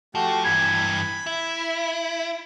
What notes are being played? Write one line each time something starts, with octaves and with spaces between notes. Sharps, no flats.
F3 A3 F#4 G4
G2 E3 B5 G#6
E4